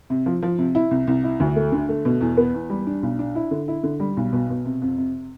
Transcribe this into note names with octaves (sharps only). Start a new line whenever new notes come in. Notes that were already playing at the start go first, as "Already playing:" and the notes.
C3
F3
F3
C3
E4
C2
C2
E4
D2
A3
D3
A3
B2
E2
B3
E2
G3
D4
B1
D4
E4
D3
E4
D3
G3
B1
B2
B2
C3
F2
C3